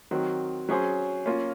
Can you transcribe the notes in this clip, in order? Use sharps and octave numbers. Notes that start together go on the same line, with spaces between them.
D#3 F#3 C4 F#4
F#3 C#4 G#4 C5
A#3 C#4 F4